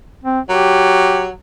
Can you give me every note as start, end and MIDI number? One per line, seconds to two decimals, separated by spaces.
0.24 0.40 60
0.49 1.30 54
0.49 1.25 67